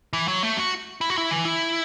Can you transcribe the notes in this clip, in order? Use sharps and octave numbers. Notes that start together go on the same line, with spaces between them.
E3
F#3
A3
F#4
E4
F#4
E4
E3
E4